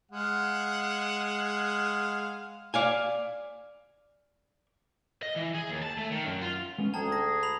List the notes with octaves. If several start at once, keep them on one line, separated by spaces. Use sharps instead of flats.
G#3 F5 F#5
D5 F5 G#5
D#5
E3
G#4
D#2
A5
A3
D#3
F#2
F4
G#3 B3 C#4
D2 G#4 G5 A5 A#5
A#6
B5 F7 F#7